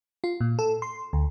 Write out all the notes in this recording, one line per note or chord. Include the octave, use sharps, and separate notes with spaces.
F4
A#2
A4
C6
D2